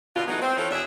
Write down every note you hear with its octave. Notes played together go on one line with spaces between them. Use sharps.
B2 D3 F4
E3 F#3 G#3 A3 B3 D#4
C4
E3 F3 C#4 F4 A4 C#5
E2 B2 D4 G#4 C#5 E5